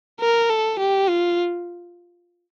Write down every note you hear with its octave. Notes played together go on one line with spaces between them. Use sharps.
A#4
A4
G4
F4